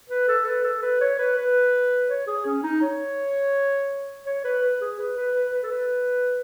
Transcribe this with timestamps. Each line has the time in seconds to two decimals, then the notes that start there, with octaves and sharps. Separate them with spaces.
0.10 B4
0.28 A4
0.46 B4
0.64 A4
0.82 B4
1.01 C#5
1.19 B4
1.36 B4
2.09 C#5
2.27 G#4
2.46 C#4
2.63 D#4
2.82 C#5
4.26 C#5
4.44 B4
4.63 B4
4.81 G#4
4.99 B4
5.17 B4
5.35 B4
5.53 B4
5.63 A4
5.71 B4